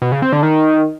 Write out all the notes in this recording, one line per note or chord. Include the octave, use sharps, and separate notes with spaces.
B2
C#3
C4
D3
D#3